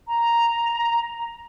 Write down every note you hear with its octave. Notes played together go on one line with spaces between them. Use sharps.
A#5